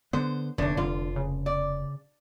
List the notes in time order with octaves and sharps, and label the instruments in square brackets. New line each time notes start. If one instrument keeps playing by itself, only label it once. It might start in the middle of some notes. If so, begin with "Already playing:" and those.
[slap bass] D3 B3 [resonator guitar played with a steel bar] C5
[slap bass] F1 D#2 [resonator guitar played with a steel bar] A2 D4 [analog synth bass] D3
[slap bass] F1 [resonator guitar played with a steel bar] F4
[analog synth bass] C#3
[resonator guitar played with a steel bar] D5